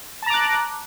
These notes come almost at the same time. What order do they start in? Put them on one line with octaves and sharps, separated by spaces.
A5 A#5 D6 F#6